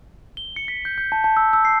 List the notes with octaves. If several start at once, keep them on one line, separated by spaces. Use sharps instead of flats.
G7
C#7
B6
G6
G6
A5
A5
E6
E6
C7